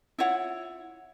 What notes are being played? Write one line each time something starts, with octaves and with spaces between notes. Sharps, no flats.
E4 F4 C#5 F#5